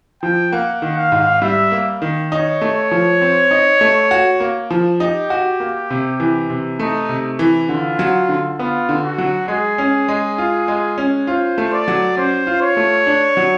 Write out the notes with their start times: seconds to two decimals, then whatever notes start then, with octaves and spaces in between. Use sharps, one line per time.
0.23 F3 G5
0.52 A#3 F#5
0.82 D#3
0.97 F5
1.12 G#2
1.42 G3 E5
1.72 A#3
2.02 D#3
2.31 D#4 C#5
2.61 A3
2.91 F3
3.21 C4
3.51 D#4
3.81 A3
4.11 F#4
4.40 A#3
4.70 F3
5.00 D#4 G4
5.30 F#4
5.60 A#3
5.90 C3
6.20 E3
6.50 C3
6.79 A3 D#4
7.09 C3
7.39 E3
7.69 D3 F4
7.99 F#3
8.29 D3
8.59 B3 F4
8.89 D3
9.04 F#4
9.18 F#3
9.48 G#3 G#4
9.78 C#4
10.08 G#3
10.38 F4
10.68 G#3
10.98 C#4
11.27 F4 C5
11.58 A3
11.72 D5
11.88 F#3
12.17 C#4 C5
12.47 F4
12.62 C#5
12.77 A3
13.07 D4
13.37 F#3